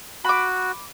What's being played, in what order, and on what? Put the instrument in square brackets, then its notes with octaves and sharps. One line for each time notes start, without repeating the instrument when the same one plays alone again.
[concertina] F#4 [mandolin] B5 D6